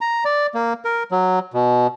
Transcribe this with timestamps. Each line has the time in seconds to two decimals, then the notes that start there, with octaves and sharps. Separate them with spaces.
0.01 A#5
0.25 D5
0.55 A#3
0.85 A#4
1.11 F#3
1.54 B2